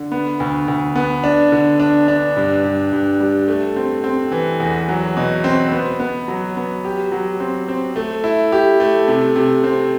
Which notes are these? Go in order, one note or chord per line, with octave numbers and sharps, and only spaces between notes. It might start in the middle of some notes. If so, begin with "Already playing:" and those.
Already playing: D3
B3
D2
D2
B3
D4
D3
D4
D4
G2
G2
G2
G3
A3
C4
C4
E3
E2
F#3
B2
C4
B3
B3
F#3
B3
G4
F#3
C4
C4
A3
E4
G4
A3
C3
C3
C4